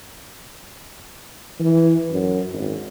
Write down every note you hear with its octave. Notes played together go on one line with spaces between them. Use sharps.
E3
F#2
G#1